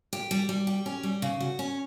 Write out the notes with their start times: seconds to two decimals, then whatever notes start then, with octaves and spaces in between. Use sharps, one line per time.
0.13 G4
0.31 G3
0.49 G3
0.67 G4
0.86 C#4
1.03 G3
1.22 C#3
1.40 F#4
1.59 C#4